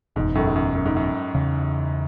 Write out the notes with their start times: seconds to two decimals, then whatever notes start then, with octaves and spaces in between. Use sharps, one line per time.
0.16 F#1 E2 G#2 B2
0.35 F#2 A2
0.47 G#2
0.55 F#2
0.75 F#2
0.85 G#2
0.96 F#2
1.35 E2 C#3 E3